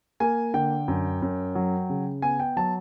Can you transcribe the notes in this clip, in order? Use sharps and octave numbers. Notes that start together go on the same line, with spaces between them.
A#3 G#5
D3 G5
F#2
F#2
F#3
C#3
B3 G#5
G5
F#3 A5